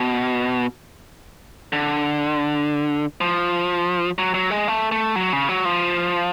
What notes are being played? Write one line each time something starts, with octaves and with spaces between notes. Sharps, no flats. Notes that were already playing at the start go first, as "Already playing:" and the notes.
Already playing: B2
D3
F3
F#3
F#3
G#3
A3
A3
F#3
C#3
F#3
F3